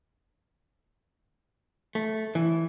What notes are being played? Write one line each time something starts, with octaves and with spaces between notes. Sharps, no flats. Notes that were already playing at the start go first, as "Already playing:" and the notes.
A3
E3